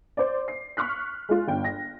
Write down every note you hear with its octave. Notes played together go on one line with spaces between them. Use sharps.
C5 D5
C7
C#6 F6 F#6 B6
G#3 F4
G1 G5
A#6